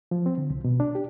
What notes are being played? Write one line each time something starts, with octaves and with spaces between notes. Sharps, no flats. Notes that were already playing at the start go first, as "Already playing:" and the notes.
F3
C4
D3
C2
B2
D4
G4